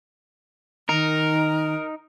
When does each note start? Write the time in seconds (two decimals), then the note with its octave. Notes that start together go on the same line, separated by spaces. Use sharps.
0.89 D#3 D#4 A#4 A#5